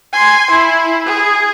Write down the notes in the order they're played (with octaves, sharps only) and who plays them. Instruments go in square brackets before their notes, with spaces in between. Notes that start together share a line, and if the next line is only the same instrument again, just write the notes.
[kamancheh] G#5 C6
E4
G#4